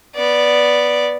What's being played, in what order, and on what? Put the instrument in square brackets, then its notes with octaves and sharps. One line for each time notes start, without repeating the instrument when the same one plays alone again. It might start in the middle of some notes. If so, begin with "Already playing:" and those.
[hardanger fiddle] B3 D5